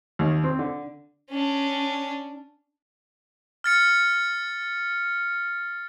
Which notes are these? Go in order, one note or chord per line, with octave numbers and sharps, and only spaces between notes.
D#2
C4
D3
C#4 D4
F6 A6 C#7